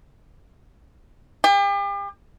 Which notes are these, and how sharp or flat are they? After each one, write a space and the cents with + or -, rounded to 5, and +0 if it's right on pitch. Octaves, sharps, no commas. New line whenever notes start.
G4 +40